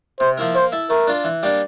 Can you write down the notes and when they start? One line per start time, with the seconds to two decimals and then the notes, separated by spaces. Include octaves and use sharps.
0.20 C3 C5
0.37 F3 A#3 E4 A#4
0.54 A#3 C5
0.72 E4 A4 E5
0.90 A3 A#4
1.07 D4 F4
1.24 E3
1.43 G3 A#3 D4